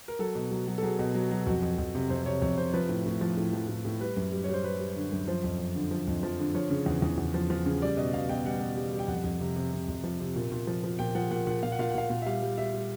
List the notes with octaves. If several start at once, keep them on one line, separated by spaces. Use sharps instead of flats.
A#4
F#3 A4
B2
F#3
F#3
A4
F#3 G#4
B2
F#3
F#3
F2 F#4
F2
F2
C3
F2 C5
C3 C#5
F2 C#5
C3 C5
F3 B4
A2
A2
F3
A2
F3
A2
A2
G3 B4
F#2
G3
G3 C#5
C5
G3 B4
G3
D3
F#2
F3 C5
F2
F2
D3
F3
F2
F3
D3
F3 C#5
C#3
E2
E2
E2
F3
F3
C#3
G3 D5
B2 D#5
B2 F5
B2 G5
G3 F#5
B2
G3
G3
G5
F2 F#5
F2
C3
C3
C3
F2
F3
C3
A#2
A#2
F3
F3
A#2 G5
F3 F#5
A#2 F#5
A#2 F#5
A#2 F5
F#5
A#2 F5
F#5
A#2 F5
A#2
E5
G3 F5
G3
G3 E5
G3